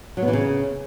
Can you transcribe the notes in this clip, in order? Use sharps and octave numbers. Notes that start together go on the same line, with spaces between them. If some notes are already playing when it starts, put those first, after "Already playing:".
F#3
B3
E3
C#3